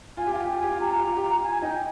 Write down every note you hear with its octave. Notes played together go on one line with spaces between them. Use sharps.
F4 G#5
G4
F5
F4 G5
G4
F4
G4 G#5
F4
G4 A#5
F4
G4
F4
G4
F4
F4 G#5
D#4 G5